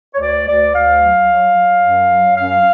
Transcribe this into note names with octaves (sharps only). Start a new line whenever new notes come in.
C#5
D2 D5
D2 D5
D2 F5
F#3
F#3
F#3
F#2
F#3
F#2 F5